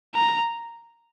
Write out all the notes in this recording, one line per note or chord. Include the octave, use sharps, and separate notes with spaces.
A#5